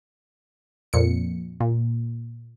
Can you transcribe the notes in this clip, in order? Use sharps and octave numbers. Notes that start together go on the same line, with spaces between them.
F2 A#2 C#7
A#2